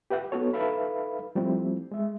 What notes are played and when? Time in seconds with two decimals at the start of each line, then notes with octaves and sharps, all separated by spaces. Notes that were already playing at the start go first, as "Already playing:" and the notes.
0.10 G4 B4 E5 F#5 G5
0.32 B3 D#4 F#4 A4 C#5
0.53 D#4 A4 B4 E5 F5 B5
1.35 F3 G3 A3 C4 E4
1.92 G#3 E5